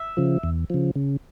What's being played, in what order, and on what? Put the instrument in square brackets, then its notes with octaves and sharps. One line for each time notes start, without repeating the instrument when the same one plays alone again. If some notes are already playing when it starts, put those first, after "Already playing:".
Already playing: [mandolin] E5
[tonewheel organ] C#3 F3
E2
C#3 F3
C#3